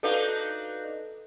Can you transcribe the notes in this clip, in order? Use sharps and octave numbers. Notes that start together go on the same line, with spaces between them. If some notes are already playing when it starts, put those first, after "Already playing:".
D4 D#4 F#4 A4 B4 F5